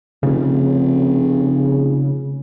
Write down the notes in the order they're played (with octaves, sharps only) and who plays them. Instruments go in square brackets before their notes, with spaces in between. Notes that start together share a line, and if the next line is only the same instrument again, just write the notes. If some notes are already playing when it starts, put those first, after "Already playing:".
[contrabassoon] F1 [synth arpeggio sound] C#3